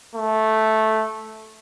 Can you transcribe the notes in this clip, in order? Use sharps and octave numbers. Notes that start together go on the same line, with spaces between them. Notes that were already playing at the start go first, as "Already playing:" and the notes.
A3